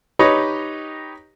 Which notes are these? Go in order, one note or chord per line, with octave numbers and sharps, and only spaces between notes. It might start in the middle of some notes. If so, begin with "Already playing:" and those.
D#4 G4 B4 C#5 D#5